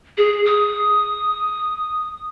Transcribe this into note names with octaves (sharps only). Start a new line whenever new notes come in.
G#4
D#6